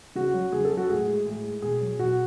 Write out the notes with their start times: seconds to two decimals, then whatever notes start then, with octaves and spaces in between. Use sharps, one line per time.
0.15 C#3 F#4
0.34 F#3
0.52 C#3 G#4
0.65 A4
0.71 F#3
0.77 F#4
0.90 A2 G#4
1.08 G#3
1.26 A2
1.44 G#3
1.62 B2 G#4
1.81 F#3
1.99 B2 F#4